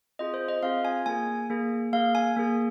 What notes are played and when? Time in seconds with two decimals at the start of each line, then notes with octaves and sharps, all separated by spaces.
0.19 C4 F4 G#4 D#5
0.34 C5
0.48 D#5
0.63 C4 F4 G#4 F5
0.85 G#5
1.06 A#3 G#4 G#5
1.50 A#3 G#4
1.93 A#3 G#4 F5
2.15 G#5
2.36 A#3 G#4